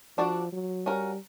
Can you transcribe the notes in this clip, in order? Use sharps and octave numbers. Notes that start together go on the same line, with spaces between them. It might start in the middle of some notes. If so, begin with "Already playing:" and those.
F3 D4 F#4 A4 D5
F#3
G3 C#4 F#4 A#4